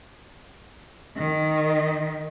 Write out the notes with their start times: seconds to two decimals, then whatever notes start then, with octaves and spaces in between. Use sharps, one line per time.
1.17 D#3